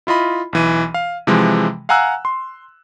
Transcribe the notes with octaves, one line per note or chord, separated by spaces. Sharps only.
E4 F4 D#5 B5
B1 E3 D#7
F5
C3 E3 F3 G#3
F5 F#5 G#5 A#5 E6 F#6
C6